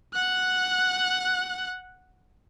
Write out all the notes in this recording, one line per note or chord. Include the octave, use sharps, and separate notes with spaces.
F#5 F#6